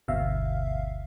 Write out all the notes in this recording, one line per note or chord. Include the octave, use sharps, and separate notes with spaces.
G1 D2 B2 E5 F5